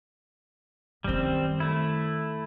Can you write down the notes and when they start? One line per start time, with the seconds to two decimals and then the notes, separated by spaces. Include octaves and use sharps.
1.04 F#2 D#3 G3 C4
1.60 A3 E4